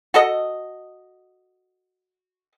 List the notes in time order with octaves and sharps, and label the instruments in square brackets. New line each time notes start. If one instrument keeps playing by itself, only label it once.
[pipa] F#4 A4 D#5